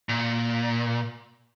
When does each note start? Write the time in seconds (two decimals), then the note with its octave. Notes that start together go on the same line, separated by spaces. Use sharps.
0.09 A#2